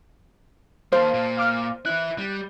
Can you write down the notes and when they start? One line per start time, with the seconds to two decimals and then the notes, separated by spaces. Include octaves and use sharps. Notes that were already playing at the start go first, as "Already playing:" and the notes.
0.92 D#3 A#3 C5 F5 A5
1.14 A#2
1.37 F5 D6 F6
1.86 E3 E4 F#6
2.19 G3